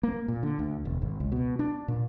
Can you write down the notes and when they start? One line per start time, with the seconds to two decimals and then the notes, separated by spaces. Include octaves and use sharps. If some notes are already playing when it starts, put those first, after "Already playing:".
0.03 A#3
0.28 A#2
0.43 D3
0.59 D2
0.85 E1
1.02 G#1
1.20 C#2
1.32 B2
1.59 D4
1.88 A#2